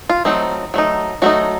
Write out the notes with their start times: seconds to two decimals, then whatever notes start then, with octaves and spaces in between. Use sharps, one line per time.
0.09 F4
0.25 F#3 A3 C4 D#4
0.74 F#3 A3 D#4
1.22 F#3 A3 D#4 F#4